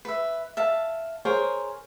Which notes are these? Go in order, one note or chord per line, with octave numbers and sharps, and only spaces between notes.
B4 E5
E5 F5 A5
G#4 A#4 C5 C#5